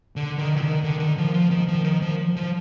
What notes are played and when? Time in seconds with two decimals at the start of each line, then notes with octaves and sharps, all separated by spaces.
0.16 D3
0.38 D#3
0.56 D3
0.62 D#3
0.83 D3
1.00 D#3
1.18 F3
1.34 F3
1.51 D#3
1.68 F3
1.85 D#3
2.02 F3
2.36 F3